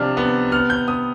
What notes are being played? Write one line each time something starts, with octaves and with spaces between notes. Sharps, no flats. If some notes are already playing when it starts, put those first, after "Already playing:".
Already playing: C3 F3 D4 F6
B3
B3 F6
G6
B3 D#6